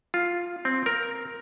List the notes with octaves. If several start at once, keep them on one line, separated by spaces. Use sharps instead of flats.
F4
C4
A#4